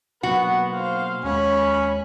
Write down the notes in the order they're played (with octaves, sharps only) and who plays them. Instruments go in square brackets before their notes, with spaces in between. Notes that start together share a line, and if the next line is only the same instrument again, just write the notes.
[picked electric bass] B2 F#3 A#3 [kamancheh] B3 [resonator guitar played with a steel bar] F#4
[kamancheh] C5 F5
[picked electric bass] D#2 G#3 [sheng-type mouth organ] C#4 [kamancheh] G#5 B5